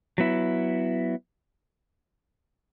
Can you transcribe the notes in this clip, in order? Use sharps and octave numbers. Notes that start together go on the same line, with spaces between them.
F#3 B3 E4